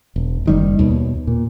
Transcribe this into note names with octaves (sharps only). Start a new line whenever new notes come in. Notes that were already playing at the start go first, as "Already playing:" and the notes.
E1
F#1 D#3 G3
D#2 B2
A#2